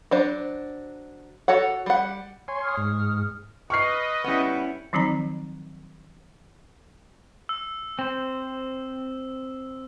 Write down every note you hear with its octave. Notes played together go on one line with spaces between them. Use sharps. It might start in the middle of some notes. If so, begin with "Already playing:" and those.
F#3 D4 C5
F#4 A4 C#5 F#5
G3 F#5
C#5 G#5 C6
C#6 D#6 F6
G#2
B4 D#5 C#6 F6 C7
G3 B3 C#4 E4
D#3 F3 F#3 C4 D#4 A#5
E6
C4 C5